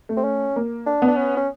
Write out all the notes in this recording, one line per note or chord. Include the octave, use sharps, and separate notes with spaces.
A3
C4
C#4
A#3
D4
B3
D4
C#4
C#4